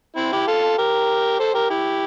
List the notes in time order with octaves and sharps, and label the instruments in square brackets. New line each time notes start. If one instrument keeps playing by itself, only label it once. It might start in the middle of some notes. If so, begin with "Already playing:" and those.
[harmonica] C4 E4
E4 G4
F4 A4
G4 A#4
A4 C5
G4 A#4
E4 G4